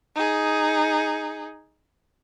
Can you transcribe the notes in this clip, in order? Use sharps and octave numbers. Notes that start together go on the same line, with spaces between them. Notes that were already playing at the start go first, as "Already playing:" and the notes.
D#4 G#4